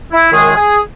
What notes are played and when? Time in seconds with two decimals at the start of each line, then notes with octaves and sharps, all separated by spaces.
0.12 E4
0.31 F#2 D#3 G#3 G#4
0.56 G#4